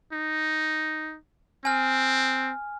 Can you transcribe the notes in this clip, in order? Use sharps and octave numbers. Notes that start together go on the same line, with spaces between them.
D#4
C4 G#5 F6